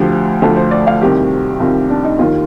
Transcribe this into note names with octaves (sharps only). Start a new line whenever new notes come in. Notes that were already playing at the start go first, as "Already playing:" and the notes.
Already playing: D2 D3 F3 G4
D2 D3 F3 A4
C5
D5
F5
C2 C3 D#3 G4
C2 C3 D#3 F4
D4
D#4
D#2 D#3 F4